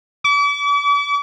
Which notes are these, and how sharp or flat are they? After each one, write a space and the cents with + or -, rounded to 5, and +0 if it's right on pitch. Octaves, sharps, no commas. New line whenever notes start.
D6 -40